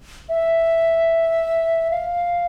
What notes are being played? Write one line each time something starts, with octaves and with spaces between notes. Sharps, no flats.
E5
F5